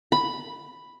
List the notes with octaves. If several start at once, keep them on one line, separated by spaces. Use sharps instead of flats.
B5